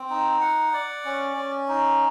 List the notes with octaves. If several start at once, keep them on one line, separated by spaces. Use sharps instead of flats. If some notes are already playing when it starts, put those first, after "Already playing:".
Already playing: C4
D#4
F#5
D5
C#4
C#4
D#4